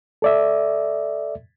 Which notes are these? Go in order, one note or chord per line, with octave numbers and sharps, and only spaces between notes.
A4 D5 E5